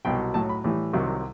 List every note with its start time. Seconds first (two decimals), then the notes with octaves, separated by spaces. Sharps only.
0.05 C2 B2 F#3 G5
0.34 A2 F#3 A5
0.49 B5
0.64 A2 E3 G3
0.93 C2 C3 D#3 F#3